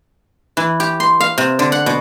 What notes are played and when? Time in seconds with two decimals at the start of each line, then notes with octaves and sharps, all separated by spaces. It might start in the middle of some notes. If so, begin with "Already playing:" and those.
0.57 E3
0.80 G4
1.00 C6
1.20 F5
1.38 C3
1.59 D3
1.72 F#5
1.86 B2